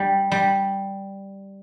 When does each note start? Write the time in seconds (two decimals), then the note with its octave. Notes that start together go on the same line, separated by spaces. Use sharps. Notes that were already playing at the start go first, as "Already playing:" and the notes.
Already playing: G3
0.32 G3